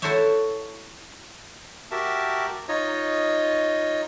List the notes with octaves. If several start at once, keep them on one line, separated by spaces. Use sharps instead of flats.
E4 F#4 A4 C5 C#5 E5
F#4 G4 A#4 E5 A5
D#4 F4 C#5 D#5